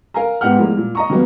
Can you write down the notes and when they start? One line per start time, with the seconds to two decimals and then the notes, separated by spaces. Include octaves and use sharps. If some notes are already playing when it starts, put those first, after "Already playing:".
0.14 A#4 F5 G#5 A#5
0.41 G#2 B3 G4 F#5 F6
0.58 A2 F3 G3 G#3 A#3
0.77 A#2
0.95 D#5 A#5 C#6
1.10 D#3 F#3 G3 A#3 B3